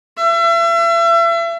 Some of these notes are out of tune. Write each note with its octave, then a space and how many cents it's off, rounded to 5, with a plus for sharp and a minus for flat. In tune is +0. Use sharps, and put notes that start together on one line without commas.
E5 +35